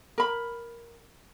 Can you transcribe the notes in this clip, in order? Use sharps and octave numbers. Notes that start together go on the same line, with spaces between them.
A#4 B5